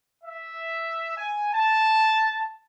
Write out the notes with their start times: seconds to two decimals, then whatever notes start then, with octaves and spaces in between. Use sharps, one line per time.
0.24 E5
1.16 G#5
1.53 A5